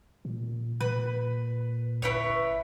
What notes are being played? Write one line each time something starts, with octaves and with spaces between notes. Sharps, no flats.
A#2
A#2 B4
G1 E4 B4 C#5